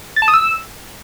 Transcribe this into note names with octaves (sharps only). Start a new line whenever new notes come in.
A6
A5
D#6
E6